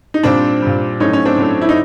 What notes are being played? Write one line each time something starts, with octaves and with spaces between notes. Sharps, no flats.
D#4
A#2 G3 C4 D4
A#2 G3
A2 F#3 A3 C#4 D#4
C#4
C4 D4
A2 F#3 A3
E4
D#4